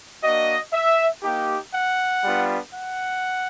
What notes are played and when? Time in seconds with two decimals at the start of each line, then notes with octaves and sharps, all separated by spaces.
0.23 A#3 D4 F#4 D#5
0.72 E5
1.23 A#3 D#4 G4
1.73 F#5
2.22 G3 B3 D4 F4
2.73 F#5